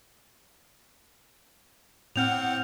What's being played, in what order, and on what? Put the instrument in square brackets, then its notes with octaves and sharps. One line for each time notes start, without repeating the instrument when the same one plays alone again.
[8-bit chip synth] A2 C4 F#5 [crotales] F6 G6 F7